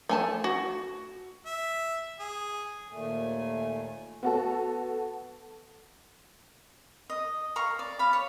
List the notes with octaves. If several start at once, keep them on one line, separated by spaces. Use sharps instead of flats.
A3 G#5 A5
F#4
E5
G#4
D#2 A#2 A3 G#5
B3 F#4 A4
D#5
F5 A#5 C#6
D5
F5 B5
C#5